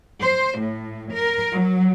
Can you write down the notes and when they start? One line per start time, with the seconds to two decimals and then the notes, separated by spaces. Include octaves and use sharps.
0.21 C5
0.60 A2
1.13 A#4
1.53 F#3